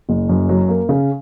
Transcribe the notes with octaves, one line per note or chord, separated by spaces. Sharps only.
F#1
F#2
F#3
A#3
C#3